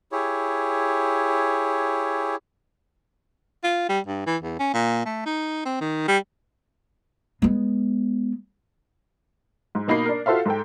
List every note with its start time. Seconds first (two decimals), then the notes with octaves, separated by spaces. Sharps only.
0.12 E4 G4 G#4 C#5
3.64 F4
3.89 G3
4.07 G2
4.26 E3
4.42 E2
4.59 C#4
4.73 A#2
5.05 A3
5.26 D#4
5.65 C4
5.81 D#3
6.08 G3
7.42 G#3 B3
9.75 G#2
9.88 B2 A#3 D#4 B5 C7
10.06 D4 A#4
10.26 F4 F#4 A4 C5 E5 F5
10.45 G#2 A4 G5